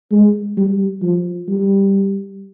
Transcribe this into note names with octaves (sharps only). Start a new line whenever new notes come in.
G#3
G3
F3
G3